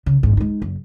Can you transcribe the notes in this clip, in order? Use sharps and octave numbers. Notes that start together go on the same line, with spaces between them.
C#3
G1 G#2
G#3 D#4
F#1